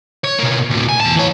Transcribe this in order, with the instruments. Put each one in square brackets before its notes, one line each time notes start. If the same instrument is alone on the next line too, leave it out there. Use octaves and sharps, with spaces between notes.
[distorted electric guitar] C#5
B2 A#3
D2 A2
G#5
E2 A5
E3 C#5